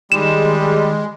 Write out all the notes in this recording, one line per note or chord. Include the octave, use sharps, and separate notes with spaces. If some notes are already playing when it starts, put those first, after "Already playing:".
D#3 G3 G#3 E7